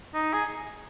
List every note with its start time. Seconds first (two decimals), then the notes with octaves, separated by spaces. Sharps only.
0.14 D#4
0.33 G#4